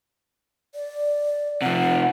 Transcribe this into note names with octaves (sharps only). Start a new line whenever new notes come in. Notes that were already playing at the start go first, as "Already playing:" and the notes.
D5
C3 F3 F#5